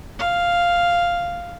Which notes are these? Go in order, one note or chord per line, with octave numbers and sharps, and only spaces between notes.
F5